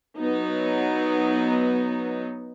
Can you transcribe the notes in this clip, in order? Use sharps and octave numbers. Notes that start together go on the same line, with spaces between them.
F#3 B3 D#4